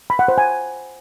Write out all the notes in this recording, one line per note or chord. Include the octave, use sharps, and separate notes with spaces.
B5
F#5
C5
G#5